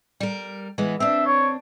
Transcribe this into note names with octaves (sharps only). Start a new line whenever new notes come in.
G3 A#4
E3 G#3 B3
C4 D4 E5
C#5